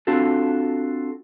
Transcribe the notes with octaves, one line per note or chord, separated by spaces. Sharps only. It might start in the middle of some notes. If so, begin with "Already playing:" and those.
C4 D4 F4 F#4 A4